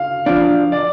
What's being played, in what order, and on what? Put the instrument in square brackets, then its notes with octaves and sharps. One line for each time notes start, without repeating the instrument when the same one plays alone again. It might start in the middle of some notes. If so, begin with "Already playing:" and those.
Already playing: [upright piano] F5
[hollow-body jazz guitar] F3 D4 [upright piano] F5
[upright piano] D5